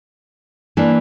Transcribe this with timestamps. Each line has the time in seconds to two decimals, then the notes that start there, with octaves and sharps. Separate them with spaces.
0.77 E3 A#3 D4